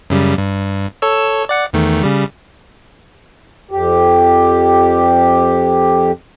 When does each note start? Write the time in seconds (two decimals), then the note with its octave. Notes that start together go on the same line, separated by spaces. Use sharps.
0.10 F#2 C#3 G3
0.38 G2
1.02 A4 C#5 E6
1.49 D5 F#5 C#7
1.73 E2 D#3 A3
2.03 C#3 G3
3.71 F2 G4